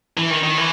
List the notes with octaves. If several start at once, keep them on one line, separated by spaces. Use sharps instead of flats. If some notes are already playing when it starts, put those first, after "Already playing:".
E3
D#3
D#3
E3